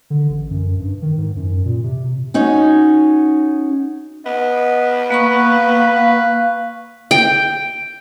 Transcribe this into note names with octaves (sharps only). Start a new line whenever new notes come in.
D3
A1
F#2
G2
D#3
G#2
F#2
A#2
C3
C#4 D#4 F#4
B3 D#5
A#3 B4 F5 B5 C#6
G5